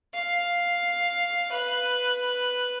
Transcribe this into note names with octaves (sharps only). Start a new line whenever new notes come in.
F5
B4